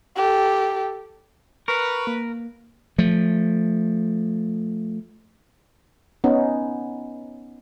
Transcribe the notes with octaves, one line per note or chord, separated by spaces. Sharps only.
G4 A4
A#4 B4 C#6
A#3
F3 A3
B3 C#4 D#4